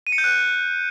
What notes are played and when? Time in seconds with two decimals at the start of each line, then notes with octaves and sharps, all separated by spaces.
0.07 D#7
0.12 C#7
0.18 G6
0.24 F#6